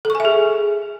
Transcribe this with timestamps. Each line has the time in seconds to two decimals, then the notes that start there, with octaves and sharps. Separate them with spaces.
0.05 A4
0.10 C#6
0.15 G#5
0.20 E5
0.25 G#4